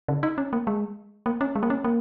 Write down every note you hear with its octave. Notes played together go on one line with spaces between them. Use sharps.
C#3
D#4
C#4
A#3
G#3
A#3
C#4
G#3
A#3
C#4
A#3